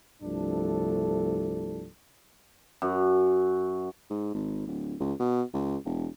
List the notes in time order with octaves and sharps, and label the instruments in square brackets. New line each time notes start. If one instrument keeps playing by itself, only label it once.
[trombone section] C2 G2 F3 A3 D4 A4
[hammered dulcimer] F#2
[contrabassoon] G#2
G#1
D1
C#2
B2
C#2
E1